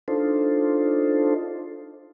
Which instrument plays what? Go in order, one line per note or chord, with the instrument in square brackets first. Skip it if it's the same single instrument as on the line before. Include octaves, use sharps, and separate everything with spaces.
[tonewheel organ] D4 D#4 F4 A4 C5